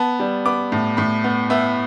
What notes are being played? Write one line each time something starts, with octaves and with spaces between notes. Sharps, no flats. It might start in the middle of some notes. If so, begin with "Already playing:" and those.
Already playing: B3 A5
G3
B3 D6
A2
A2 B5
B3
B3 E5